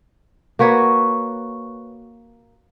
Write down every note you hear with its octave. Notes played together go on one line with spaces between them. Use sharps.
A#3 F#4 B4 C#5